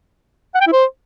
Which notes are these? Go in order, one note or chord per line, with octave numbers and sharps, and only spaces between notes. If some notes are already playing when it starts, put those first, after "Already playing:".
F#5
G5
E4
C5